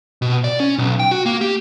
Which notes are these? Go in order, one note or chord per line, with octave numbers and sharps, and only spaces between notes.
B2
D5
C#4
B1
G5
F#4
A#3
G4